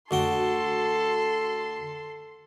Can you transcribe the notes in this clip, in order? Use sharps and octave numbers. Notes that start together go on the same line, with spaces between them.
D2 F#4 A4 G5 C6